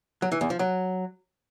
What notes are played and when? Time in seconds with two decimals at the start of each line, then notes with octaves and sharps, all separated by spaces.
0.22 F#3
0.32 E3
0.41 E2
0.50 F3
0.59 F#3